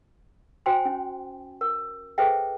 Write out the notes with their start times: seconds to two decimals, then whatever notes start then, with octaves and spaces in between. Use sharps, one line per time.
0.66 F#4 C5 G5 G#5 C6
0.85 C#4
1.61 A#4
2.18 G#4 A4 B4 C5 E5 G5